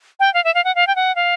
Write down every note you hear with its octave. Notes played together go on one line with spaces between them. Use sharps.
G5
F5
E5
F5
F#5
F5
G5
F#5
F5